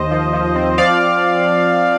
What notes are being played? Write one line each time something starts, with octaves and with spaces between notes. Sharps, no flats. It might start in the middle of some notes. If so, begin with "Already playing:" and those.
Already playing: D#2 C5 D#5
F3
F3
C4
F3 D5 F5